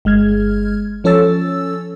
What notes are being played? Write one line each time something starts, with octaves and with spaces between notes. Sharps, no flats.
G1 G#3 F6 G#6
F3 C#4 A4 C#5 E6 A6